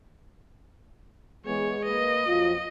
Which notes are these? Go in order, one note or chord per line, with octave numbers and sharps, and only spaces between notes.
E3 G#3 B3 G#4 C#5
A#3 B4 D#5
F2 F3 F#3 F4